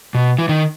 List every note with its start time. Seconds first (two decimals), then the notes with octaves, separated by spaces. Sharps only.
0.14 B2
0.38 E3
0.49 D#3